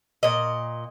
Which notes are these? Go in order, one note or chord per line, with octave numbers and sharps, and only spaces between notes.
A#2 D#5